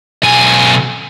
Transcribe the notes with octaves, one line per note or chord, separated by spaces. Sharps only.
B1 G#5